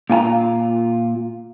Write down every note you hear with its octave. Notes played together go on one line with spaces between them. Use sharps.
A#2 F4 G#5 A#5